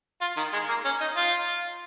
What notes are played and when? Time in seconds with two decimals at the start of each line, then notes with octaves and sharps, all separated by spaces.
0.21 F4
0.37 D#3
0.53 G#3
0.69 A#3
0.85 C#4
1.01 D#4
1.16 F4